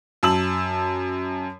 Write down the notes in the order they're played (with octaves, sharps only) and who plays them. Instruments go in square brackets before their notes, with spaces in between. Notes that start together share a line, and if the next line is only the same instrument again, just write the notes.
[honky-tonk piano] F#2 A5 E6 F#7